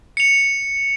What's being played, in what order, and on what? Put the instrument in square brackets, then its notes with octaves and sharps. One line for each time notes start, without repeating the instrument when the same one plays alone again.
[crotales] C#7 F7